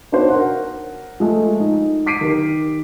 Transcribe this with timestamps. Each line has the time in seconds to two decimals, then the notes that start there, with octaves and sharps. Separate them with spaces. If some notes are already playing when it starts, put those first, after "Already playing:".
0.12 B3 D4 D#4 F#4 C5 C#5
0.30 A#4 F#5
1.20 F3 G#3 A3
1.60 D#4
2.06 D6 B6 C7 D7 D#7
2.21 D#3 G4 A#4